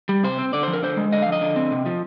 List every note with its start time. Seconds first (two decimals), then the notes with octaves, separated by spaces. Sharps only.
0.09 G3
0.23 C3 C5
0.39 C4
0.53 D3 D5
0.63 F3 C5
0.73 A#4
0.83 D3 C5
0.97 G#3
1.12 D3 D#5
1.22 F3 F5
1.32 D#5
1.41 D3
1.56 C4
1.72 C3
1.86 F3